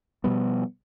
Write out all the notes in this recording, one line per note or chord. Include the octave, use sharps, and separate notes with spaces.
B2 F3 G3 B3